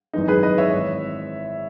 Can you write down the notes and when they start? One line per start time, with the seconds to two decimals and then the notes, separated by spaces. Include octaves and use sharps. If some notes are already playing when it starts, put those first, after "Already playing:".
0.13 G#1 F#2 E3 D#4
0.28 G#4 B4
0.43 B4 D#5
0.58 C#5 E5
0.73 G#1 E3